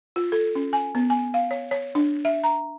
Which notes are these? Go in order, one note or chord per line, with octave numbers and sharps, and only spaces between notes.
F4
A4
C#4
G#5
B3
G#5
F5
C#5
C#5
D4
E5
A#5